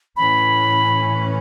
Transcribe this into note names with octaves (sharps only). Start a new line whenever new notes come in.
A2 E3 C#4 B5